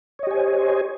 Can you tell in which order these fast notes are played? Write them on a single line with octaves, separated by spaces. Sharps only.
C#5 D#5 G4 G#5 C5